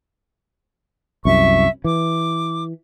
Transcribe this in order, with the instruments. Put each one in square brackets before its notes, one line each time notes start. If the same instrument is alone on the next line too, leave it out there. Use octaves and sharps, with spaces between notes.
[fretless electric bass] C2 F#2 [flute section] E5 C#6
[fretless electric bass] E3 [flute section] D6